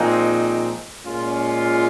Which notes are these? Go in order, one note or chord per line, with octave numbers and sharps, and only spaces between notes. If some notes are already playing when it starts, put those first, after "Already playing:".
Already playing: A#2 F3 G#3 C4 D#4
A#2 G#3 C#4 F4